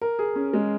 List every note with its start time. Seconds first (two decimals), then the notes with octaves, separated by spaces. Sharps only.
0.02 A#4
0.19 G#4
0.36 C#4
0.53 G#3